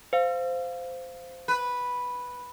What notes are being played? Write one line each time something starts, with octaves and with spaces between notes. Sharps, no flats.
C5 F5
B4